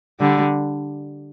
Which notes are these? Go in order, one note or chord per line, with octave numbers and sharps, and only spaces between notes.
D3 G3